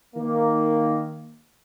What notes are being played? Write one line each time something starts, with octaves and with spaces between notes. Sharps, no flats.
D#3 A#3